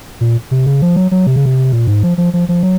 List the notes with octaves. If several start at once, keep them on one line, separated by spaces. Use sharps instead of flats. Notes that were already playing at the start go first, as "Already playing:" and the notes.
A#2
C3
C#3
F3
F#3
F#3
C3
C#3
C3
A#2
G#2
F3
F3
F3
F3
F#3